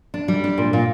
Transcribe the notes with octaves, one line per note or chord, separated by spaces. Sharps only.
D4
G3
D4
A#2
A#2